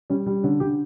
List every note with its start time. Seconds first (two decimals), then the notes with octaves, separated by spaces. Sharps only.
0.10 G3 C#4
0.26 G3
0.43 D3 C#4
0.60 D3 G4